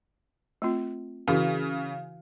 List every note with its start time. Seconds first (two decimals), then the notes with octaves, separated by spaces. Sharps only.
0.62 A3 C4 F4
1.28 C#3 E3 E4 F#4